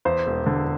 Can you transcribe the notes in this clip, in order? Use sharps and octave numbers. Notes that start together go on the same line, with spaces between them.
E2 C5
E1
D3